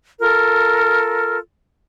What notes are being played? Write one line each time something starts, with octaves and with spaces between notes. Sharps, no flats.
F4 A4 A#4